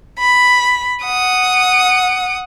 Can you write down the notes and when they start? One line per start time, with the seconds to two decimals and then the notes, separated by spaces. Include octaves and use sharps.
0.19 B5
1.04 F#5 D#6